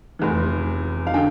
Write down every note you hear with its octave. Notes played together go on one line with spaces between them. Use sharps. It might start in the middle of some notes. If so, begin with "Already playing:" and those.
F1 E2 E3
F5
D3 G5